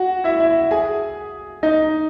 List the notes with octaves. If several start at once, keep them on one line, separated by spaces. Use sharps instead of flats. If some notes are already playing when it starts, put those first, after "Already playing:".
Already playing: F#4 F#5
E4 E5
E4 E5
G#4 G#5
D#4 D#5